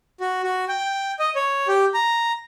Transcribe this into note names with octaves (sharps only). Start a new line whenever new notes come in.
F#4
F#4
G5
D#5
C#5
G4
A#5